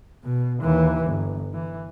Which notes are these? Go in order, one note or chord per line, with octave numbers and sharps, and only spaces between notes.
B2
D#2 E3
G1
E3